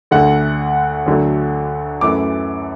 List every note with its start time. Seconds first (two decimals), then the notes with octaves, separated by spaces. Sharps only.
0.11 D2 D3 A3 F#5
1.06 D2 D3 F#3 A3
2.01 F#2 E3 A3 D6